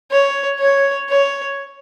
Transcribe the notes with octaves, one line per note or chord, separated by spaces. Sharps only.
C#5
C#5
C#5